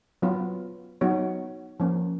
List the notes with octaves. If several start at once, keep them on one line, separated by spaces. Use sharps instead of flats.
F#3 B3 F4 B4
F#3 B3 D#4 F#4 C#5
F3 A#3 C#4